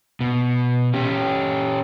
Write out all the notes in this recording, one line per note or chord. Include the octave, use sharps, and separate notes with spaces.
B2
C#4 G4